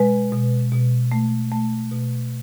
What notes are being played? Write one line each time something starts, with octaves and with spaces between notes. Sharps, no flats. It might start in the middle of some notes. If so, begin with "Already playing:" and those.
Already playing: B2 G#3 B4
B2
B2
A3
A3
B2